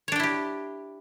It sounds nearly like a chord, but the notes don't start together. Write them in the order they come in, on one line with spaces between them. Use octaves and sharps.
C#5 D4 G5 E4 G4